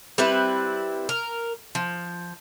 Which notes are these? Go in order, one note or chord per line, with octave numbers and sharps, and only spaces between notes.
G3 C4 E4 B4
A#4
F3